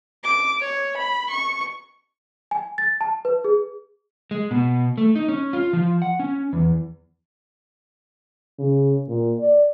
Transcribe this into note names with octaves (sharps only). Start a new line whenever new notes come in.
D6
C#5
B5
C#6
G#5
A6
A5
B4
G#4
G#3
B2
A3
D#4
C#4
F4
F3
F#5
C#4
E2
C#3
A#2
D5